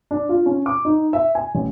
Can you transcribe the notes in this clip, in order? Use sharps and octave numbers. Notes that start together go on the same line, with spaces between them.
D4
F4
C#4
D6
D#4
E5
G#5
A1